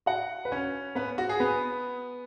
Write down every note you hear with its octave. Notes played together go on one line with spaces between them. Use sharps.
F#4 F#5
B4
C#4 C#5
B3 B4
F#4
G#4
B3 B4